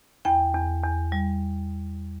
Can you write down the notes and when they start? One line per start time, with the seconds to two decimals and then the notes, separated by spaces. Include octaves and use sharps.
0.25 E2 G5
0.54 E2
0.83 E2
1.12 G3